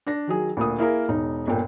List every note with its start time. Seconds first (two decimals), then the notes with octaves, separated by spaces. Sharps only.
0.07 D4 A#6
0.27 D#3 F#3 G#4
0.57 D2 A#2 D#6
0.78 A#3 E4 G#4 A#4
1.08 E1 D#4
1.47 G1 A#2 G5